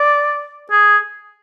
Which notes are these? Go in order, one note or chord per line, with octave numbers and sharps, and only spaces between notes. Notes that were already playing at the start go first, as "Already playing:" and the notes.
Already playing: D5
G#4